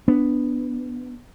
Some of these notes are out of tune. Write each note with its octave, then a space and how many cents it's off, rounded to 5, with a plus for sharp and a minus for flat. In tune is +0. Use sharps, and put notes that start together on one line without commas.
B3 +0 D4 +0